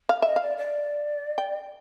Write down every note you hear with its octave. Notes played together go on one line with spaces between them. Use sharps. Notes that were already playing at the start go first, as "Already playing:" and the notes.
F5
D#5 E5
F5
D5
D5
G5